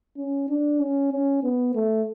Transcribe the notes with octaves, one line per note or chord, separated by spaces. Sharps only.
C#4
D4
C#4
C#4
B3
A3